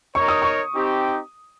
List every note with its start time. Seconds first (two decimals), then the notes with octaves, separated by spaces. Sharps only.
0.15 D#4 A#4 C#5 C#6
0.28 D#6
0.42 C#6
0.73 C4 D#4 G4